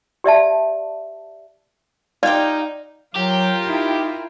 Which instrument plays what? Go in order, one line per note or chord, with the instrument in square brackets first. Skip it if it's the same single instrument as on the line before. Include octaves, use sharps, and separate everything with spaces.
[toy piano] G4 D5 E5 A5
[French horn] D#4 [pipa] F4 G4 [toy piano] D5 [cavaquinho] F5 G5
[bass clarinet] F#3 [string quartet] F4 A#4 G5 [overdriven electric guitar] G4
[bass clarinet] D#4 [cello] E4